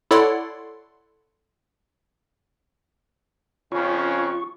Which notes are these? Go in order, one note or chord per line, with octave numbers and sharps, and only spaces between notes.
E4 A4 C#5 D5 F#5 C6
F2 C#3 C#4 F4 C#6